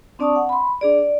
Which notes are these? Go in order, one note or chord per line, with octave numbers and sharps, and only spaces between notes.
C4 D4 D5 A5 C#6 D#6
F#5
B5 C6
D4 G#4 D5
D5